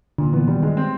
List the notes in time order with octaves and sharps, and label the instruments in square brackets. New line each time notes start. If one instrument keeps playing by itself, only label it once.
[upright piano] A#2 [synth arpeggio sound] D3
[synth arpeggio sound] E3 [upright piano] B3
[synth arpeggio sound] D#3 [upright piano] G3
[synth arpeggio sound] D#3 [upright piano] G#3
[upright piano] C4